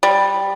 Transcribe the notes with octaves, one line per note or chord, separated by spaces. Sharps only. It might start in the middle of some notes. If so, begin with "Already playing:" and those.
G3